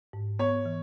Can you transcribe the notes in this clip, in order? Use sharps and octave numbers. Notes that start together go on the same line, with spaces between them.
G#2
B3 C#5
E3